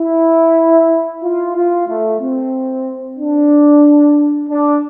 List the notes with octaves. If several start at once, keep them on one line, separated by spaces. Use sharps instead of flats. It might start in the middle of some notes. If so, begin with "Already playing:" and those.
Already playing: E4
F4
F4
A3
C4
D4
D4